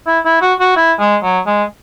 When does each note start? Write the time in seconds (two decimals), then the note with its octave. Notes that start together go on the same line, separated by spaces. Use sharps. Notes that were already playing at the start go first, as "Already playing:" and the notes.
0.07 E4
0.25 E4
0.42 F#4
0.60 F#4
0.76 E4
1.00 G#3
1.23 F#3
1.47 G#3